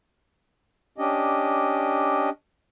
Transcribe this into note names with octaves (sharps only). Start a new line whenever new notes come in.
C#4 D4 G4 D#5